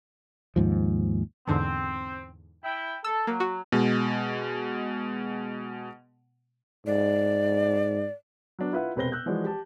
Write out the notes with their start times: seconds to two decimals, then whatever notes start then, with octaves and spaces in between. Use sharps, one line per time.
0.56 D#2 G#2 F3
1.47 E2 G#2 D3 C4
2.64 E4 G5
3.04 A4 E6
3.27 F#3 A#3
3.40 F#4
3.72 B2 G#3
6.86 G#2 D5
8.59 F#3 B3 D4
8.73 E4 F4 B4 E5 F#5
8.96 E1 C3 B4 C5 A#6 G7
9.12 E6 F#6 G6
9.26 E3 F3 G#3 F#4 D5
9.44 G4 A5